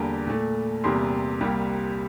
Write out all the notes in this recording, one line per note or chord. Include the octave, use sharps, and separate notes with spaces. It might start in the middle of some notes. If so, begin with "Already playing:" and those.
Already playing: E2 D3 G3 A#3 A5
A#2 A3
E2 C3 G3 A#3 C6
C2 C3 G3 A#3